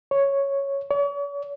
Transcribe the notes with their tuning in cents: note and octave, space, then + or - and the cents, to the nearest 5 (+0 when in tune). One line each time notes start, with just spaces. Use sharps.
C#5 +0
C#5 +45